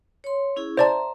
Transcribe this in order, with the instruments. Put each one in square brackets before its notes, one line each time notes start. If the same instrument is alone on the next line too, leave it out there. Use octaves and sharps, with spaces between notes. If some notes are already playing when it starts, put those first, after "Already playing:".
[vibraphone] C#5 C6
C#4 E4 G#4
[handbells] C5 D5 A5 [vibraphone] E5 A#5 C6